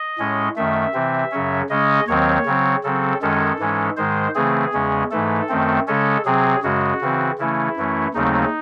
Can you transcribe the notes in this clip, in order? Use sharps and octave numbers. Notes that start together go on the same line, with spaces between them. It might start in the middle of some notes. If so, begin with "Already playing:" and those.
Already playing: D#5
A2 G#3 C#4
F#2 D#3 A3 E5
C3 E3 C4
F#2 C#3 F#3 C#4
C#3 G#3 C#4 D#5
D#2 D#3 F#3 C4 C#5
C#3 F#3 C4
C#3 F#3 C4 A4
F#2 D#3 G#3 C#4 A4
G#2 E3 G#3 C#4
G#2 D#3 G#3 C5
C#3 E3 A3 C4 G#4
E2 C#3 G#3 C#4
G#2 E3 A3 A4
F#2 D#3 A3 C4
C#3 G#3 C#4 A4
C3 F#3 C4 G#4
F#2 C#3 G#3 F#4
C#3 E3 C4
C#3 E3 A3 C#4 E4
F#2 E3 A3 C#4
D#2 C#3 F#3 A3 C4 D#4